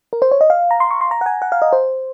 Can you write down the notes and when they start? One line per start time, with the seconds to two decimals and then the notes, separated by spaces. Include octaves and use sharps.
0.13 A#4
0.22 C5
0.31 C#5
0.41 D#5
0.50 F5
0.71 A#5
0.80 C6
0.91 C#6
1.01 C6
1.11 A#5
1.21 F#5
1.26 G#5
1.42 F#5
1.52 F5
1.62 D#5
1.73 C5